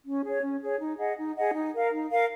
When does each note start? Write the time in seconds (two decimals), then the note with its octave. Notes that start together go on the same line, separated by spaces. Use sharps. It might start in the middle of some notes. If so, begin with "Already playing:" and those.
0.06 C#4
0.24 G#4 C#5
0.42 C#4
0.61 G#4 C#5
0.80 D#4
0.98 G#4 D#5 F#5
1.17 D#4
1.36 G#4 D#5 F#5
1.54 D#4
1.74 A#4 F5
1.92 D#4
2.11 A#4 F5